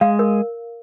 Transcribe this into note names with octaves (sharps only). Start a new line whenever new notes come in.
G#3 F5
A#4